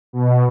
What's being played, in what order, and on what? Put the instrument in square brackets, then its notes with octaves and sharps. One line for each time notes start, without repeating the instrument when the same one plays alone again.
[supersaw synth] B2